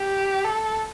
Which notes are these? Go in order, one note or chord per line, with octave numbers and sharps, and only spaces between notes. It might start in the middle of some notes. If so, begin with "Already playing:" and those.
Already playing: G4
A4